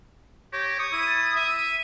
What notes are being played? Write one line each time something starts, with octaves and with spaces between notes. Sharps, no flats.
G4 C#5 A#6
C#6 D#6
E4 D#7
A6
E5 D#7